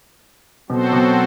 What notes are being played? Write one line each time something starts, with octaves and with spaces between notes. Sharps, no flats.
B2 F#3 C4 F#4 A4 C5
B2